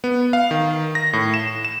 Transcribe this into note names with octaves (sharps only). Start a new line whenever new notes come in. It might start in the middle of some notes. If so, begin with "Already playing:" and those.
B3
F5
D#3
A#6
A2
E7
E7